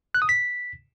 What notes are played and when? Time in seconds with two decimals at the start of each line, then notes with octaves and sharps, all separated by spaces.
0.14 F#6
0.22 D#6
0.29 B6